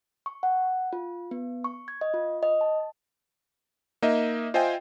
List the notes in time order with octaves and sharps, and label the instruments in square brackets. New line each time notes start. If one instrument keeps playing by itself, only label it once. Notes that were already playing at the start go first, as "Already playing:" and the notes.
[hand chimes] C#6
F#5
F4
B3
C#6
G#6
D#5
F4
D#5
A5
[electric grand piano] A#3 D#4 D#5 E5
F4 C5 D#5 E5 G5 G#5